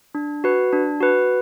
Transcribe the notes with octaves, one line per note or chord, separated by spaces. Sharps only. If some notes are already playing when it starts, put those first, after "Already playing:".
D4
F#4 B4
D4
F#4 B4